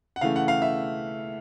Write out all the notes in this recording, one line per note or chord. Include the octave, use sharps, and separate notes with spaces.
F#5
C#3 E3 A3 F5
F#5
F5
E5